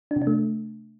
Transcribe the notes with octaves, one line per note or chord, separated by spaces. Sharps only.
D4
C3
D4
A3